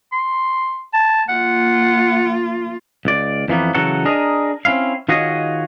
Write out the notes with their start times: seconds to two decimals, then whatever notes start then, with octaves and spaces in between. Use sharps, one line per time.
0.12 C6
0.93 A5
1.29 A#3 F4 F#5
3.05 C#2 D5
3.48 F2 E3 A#3 B3
3.75 C#3 E3 F#3 F#4 A4 F#5
4.05 D4 G#4 A#4 D#5 A#5
4.65 C4 C#4 E4 F5
5.09 D#3 F4 F#4 G#4 C#5 D#5